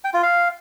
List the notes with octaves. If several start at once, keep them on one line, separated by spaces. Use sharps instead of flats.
G5
F4
F5